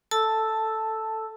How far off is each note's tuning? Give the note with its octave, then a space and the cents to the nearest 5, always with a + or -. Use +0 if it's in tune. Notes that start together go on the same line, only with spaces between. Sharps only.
A4 +5 A5 +0 E6 +0